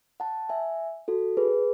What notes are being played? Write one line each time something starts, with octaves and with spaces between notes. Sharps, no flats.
F#5 A5
E5 G#5
F#4 A4
G#4 B4